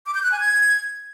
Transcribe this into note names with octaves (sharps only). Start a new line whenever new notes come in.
D6
G6
F#6
G#5
G#6